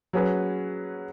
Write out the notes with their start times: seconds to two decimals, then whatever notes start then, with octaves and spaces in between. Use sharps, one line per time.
0.13 F#3 C#4 G#4 B4